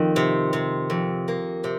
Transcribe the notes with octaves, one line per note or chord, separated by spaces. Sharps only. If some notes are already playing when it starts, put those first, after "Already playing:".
Already playing: F2 D#3
C3
C3
F2
A#3
C3